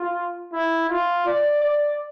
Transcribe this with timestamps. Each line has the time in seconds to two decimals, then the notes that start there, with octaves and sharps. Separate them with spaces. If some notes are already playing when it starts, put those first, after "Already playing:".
Already playing: F4
0.52 E4
0.89 F4
1.26 D5
1.63 D5